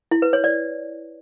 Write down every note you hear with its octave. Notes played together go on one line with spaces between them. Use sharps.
E4
B4
C#5
D5